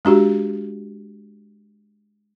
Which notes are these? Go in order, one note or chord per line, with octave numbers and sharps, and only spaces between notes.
G#3 D4 F#4 G4